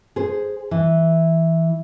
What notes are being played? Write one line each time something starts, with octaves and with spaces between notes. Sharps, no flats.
G#4 C5
E3